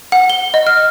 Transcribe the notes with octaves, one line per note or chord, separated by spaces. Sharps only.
F#5
G7
D#5
F6